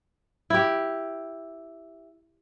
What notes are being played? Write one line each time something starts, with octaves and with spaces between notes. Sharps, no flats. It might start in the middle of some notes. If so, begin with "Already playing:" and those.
E4 G4